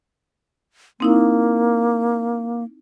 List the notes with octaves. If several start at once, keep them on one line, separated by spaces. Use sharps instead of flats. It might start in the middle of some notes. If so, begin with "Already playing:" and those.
A#3 C4 D#4 E4